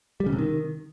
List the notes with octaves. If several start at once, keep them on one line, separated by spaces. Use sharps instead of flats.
G3
C#3
C3
D#3